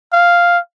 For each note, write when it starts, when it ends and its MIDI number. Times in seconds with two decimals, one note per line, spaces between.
0.13 0.59 77